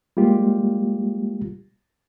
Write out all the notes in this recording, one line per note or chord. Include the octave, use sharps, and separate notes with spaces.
G3 G#3 A#3 F4 G4